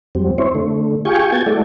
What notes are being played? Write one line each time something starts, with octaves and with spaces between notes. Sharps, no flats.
F2 F#3 G3 C4
C4 E4 C5 C#5
D3 A3
F4 G4 G#4 G5 G#5 C#6
B3 F#4 G5 A5 G#6
G#3 A3 E4 F#4 A4 D5